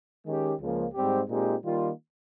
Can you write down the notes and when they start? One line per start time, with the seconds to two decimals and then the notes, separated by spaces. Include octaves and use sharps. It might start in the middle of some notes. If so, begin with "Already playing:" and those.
0.26 D#3 G#3 C#4 G4
0.59 C#2 C#3 F3 A#3
0.94 G#2 G3 C4 G4
1.27 A#2 G#3 C4 D#4 G4
1.62 D#3 G3 A#3 F4